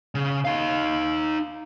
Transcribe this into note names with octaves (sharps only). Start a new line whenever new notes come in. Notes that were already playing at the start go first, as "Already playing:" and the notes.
C#3
D#4 F5